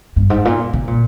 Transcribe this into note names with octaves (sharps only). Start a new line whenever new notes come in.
G2
G#2
A#2
C3
A#2